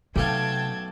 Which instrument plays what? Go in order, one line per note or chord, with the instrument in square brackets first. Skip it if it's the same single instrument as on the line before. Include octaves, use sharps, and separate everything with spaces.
[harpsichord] B1 A3 F5 [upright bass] C3 [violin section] G5 A5 G#6